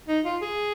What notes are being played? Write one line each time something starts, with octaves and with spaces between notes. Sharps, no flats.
D#4
F4
G#4